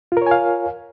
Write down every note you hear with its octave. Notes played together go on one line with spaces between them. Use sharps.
F4 A#4 C#5 F5 G#5